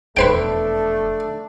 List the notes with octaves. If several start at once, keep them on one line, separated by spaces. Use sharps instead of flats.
E1 F2 A3 D4 B4 C5 G5